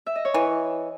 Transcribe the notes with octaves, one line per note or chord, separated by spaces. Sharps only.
E5
D#5
C#5
E3